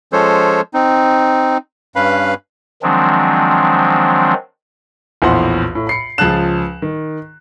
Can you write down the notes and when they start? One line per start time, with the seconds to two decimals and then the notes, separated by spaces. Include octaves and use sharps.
0.13 F3 G#3 C#4 A4 C5 C#5
0.74 C4 D#4
1.96 G2 C#4 B4 F5 B5
2.82 D#3 F3 F#3 G#3 C4 D4
5.22 A#1 E2 A2 C5 F#5 C6
5.75 A2
5.87 B5 C7 C#7
6.18 C#2 F3 G#4 A5 F#6 E7
6.82 D#3